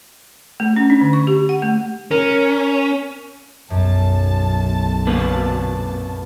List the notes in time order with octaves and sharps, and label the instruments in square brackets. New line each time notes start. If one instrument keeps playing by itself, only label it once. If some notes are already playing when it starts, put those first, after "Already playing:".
[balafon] A3
C#4
D4
D3
C#6
G4
F#5
A3
[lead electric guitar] C#4 [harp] A#4
[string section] B1 A5 [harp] F#2
[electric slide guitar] A#2 A#3 B4